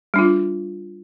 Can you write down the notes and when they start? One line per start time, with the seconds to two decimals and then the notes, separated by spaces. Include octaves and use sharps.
0.14 G3 D4 F4